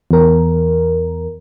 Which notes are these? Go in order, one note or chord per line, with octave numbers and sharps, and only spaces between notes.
E2 A#4